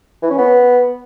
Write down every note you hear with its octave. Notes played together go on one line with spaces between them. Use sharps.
E3
C#4
B3